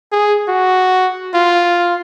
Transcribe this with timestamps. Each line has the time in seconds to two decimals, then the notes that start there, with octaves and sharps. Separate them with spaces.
0.12 G#4
0.48 F#4
1.34 F4